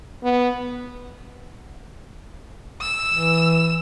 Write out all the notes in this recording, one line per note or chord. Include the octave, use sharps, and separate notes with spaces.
B3
E6
E3